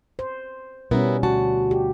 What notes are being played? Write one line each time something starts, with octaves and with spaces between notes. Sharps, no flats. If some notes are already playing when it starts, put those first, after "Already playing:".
C5
B2 G3 B3 C#4 E4 A#4
D2 F#4 A5
G4